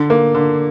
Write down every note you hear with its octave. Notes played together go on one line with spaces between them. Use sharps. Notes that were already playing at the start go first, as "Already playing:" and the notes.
Already playing: D3
A#3
D3